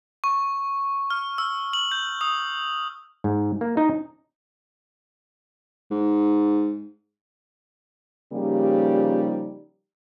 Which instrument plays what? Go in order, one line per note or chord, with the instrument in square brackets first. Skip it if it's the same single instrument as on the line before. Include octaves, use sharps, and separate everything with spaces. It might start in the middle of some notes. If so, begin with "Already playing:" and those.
[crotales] C#6
F6
E6
F#7
G6
D#6
[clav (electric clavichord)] G#2
A#3
D#4
[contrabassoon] G#2
[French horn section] C#3 F3 G3 A#3 D#4 G4